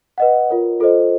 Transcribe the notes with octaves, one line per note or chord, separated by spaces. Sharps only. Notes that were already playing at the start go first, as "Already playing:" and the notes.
B4 D#5 F#5
F4 A#4 C#5
F4 A4 C5 D#5